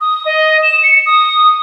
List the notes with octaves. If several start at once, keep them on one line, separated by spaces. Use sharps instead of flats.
D#6
D#5
E7
C#7
D#6